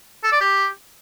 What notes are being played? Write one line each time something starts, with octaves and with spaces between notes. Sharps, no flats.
A4
D5
G4